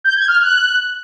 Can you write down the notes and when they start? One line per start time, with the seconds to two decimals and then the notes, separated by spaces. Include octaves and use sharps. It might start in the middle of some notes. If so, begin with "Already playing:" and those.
0.04 G6
0.16 G#6
0.28 F6
0.40 F#6